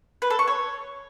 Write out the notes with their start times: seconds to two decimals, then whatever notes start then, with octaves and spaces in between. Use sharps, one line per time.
0.22 B4
0.30 A4
0.39 C#6
0.47 C#5